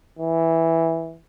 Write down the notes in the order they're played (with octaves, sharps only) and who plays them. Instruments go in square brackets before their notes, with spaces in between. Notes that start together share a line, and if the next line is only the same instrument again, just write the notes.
[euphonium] E3